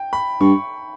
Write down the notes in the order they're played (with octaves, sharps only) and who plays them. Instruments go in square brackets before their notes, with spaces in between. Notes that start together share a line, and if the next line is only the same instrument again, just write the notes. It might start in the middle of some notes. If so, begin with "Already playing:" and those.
Already playing: [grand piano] G5
B5
[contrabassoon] G2 [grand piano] C#6